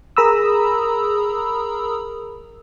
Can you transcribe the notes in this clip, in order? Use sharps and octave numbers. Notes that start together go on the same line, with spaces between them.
G#4 A#4 A#5 B5 D#6 E6